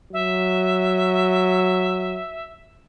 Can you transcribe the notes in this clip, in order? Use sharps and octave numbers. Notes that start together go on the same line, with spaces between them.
F#3 E5